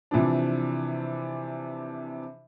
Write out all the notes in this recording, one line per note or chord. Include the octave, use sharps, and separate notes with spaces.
C3 E3 F3 D4